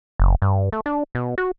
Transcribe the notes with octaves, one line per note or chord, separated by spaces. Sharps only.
F#1
G2
A3
D4
B2
F#4